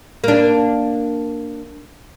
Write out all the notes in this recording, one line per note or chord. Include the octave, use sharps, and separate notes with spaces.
A#3 D4